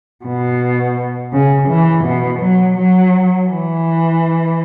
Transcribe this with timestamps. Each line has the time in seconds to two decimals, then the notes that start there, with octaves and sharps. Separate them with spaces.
0.26 B2
1.33 C#3
1.69 E3
2.05 B2
2.40 F#3
2.77 F#3
3.49 E3